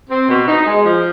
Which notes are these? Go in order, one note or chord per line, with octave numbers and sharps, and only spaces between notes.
C4
B2
D#4
G#3
F3